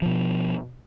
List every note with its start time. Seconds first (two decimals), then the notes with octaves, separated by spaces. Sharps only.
0.02 B2 F3